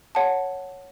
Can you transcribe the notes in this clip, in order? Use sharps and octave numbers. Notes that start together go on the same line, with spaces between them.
C#5 F#5 A5